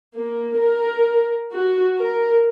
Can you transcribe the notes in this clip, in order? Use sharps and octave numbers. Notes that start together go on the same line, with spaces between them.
A#3
A#4
F#4
A#4